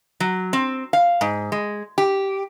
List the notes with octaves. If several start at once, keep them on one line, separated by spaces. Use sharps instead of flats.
F#3
C4
F5
G#2
G#3
G4